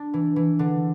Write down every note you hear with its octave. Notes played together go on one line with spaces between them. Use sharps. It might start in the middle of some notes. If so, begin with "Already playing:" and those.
Already playing: D4
E3
E3
D3